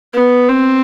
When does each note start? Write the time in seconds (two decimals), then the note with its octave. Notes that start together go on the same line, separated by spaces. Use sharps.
0.14 B3
0.49 C4